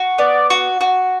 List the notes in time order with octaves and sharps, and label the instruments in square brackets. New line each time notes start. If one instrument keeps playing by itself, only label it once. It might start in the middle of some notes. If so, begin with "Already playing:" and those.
Already playing: [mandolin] F#4
[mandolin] B3 [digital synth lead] D5
[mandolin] F#4
F#4